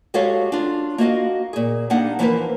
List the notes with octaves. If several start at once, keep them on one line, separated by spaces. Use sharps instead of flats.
G#3 F#4 G4 A4 C#5 F5
D4 F4
A#3 F#4 D#5 F5
A#2 G#4
G3 A#3 D4 D#4 F#5
E3 F3 A#3 F4 A#4 B4